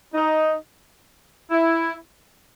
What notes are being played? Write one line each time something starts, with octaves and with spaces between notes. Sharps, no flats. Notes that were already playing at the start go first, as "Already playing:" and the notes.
D#4
E4